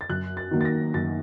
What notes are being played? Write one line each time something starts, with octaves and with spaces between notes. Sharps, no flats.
A6
F#2 F#6
A6
D#3 F#3 A#3
A6
A#6
F#2 A6